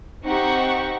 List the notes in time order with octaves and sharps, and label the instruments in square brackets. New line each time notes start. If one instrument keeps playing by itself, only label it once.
[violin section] C4 D#4 G4 F#5 C#6